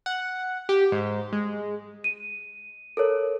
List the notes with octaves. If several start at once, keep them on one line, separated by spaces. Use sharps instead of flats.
F#5
G4
G#2
G#3
D#7
A4 A#4 C#5